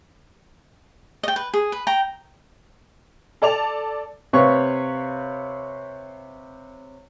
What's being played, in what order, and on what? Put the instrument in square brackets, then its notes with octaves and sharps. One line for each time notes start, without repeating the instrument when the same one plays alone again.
[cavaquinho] D#5 G5
B4
G#4
B4
G5 A#5
[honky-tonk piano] A4 D5 A5 F7
[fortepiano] C3 C4 B4 C#5 F5 C#6